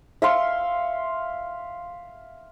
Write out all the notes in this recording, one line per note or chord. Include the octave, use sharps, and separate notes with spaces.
E5 F5 C6 C#6